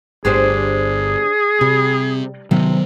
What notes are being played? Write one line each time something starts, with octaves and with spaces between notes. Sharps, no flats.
G1 D4 G4 G#4 C5
C3 G3
C3 D#3 F#3 B3